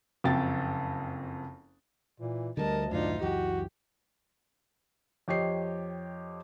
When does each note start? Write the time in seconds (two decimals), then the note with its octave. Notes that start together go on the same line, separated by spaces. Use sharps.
0.24 F#1 F2 G5 A6
2.20 A#2 E3
2.57 D2 D3 F#3 G3 A#4 D#5 A5
2.91 F#2 A2 D#3 D4 D#4 F4
3.22 C#2 F#2 E3 F#4 G4
5.28 F2 G4 C#5 D#5 C7